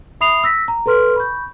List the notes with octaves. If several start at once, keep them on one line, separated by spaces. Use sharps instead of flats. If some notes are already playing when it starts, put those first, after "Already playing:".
E5 B5 D#6 C7 F7
E6 A#6 B6
A#5
A4 B4 C6 F6
B5 C#6 G6